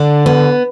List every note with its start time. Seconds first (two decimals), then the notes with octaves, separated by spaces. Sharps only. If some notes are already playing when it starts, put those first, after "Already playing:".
Already playing: D3 D4
0.26 B3